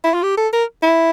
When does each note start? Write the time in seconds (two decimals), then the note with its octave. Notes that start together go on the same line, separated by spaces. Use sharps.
0.04 E4
0.14 F4
0.23 G4
0.37 A4
0.53 A#4
0.83 E4